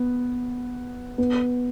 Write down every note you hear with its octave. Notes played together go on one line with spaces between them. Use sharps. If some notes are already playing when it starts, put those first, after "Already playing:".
Already playing: B3
B3